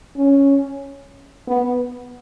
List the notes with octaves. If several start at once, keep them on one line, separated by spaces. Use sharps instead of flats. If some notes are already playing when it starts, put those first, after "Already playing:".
C#4
B3